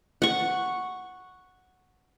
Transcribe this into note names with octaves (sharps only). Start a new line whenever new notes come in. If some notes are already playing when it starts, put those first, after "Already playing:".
F#5 C#6